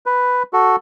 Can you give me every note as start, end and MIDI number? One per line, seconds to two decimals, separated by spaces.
0.06 0.43 71
0.53 0.76 66
0.53 0.76 69